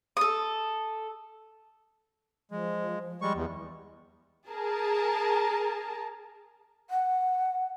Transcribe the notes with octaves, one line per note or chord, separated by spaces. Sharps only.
A4 D#6
F3 G#3
G3 G#3 C#6
E2
G#4 A#4 A5
F#5